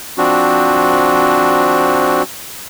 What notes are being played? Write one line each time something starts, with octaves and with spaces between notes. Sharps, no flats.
F3 C4 D4 F#4